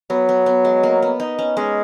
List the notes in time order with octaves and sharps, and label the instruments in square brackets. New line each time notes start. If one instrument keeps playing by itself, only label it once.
[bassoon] F#3 [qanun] B3
[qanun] B3
B3
G#3
A#3
B3
D#4
C#4
[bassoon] G#3 [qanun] C#4